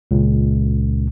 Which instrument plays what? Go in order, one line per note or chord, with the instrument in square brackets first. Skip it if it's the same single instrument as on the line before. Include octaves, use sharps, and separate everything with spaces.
[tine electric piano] C#2 A#2